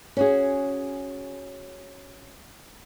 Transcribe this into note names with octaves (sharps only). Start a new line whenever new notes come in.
C#4 F#4 G#4